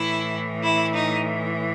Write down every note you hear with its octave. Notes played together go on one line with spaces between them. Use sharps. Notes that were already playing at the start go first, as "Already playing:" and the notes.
Already playing: A2 E3 E4
E4
D#4